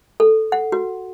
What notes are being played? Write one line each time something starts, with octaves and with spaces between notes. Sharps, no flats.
A4
F#5
F#4